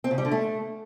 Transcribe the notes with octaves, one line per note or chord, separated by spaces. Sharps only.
C4
C#3
G3
D3
A3